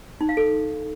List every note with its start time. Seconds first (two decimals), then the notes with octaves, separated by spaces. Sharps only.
0.21 D#4
0.29 F5
0.37 A4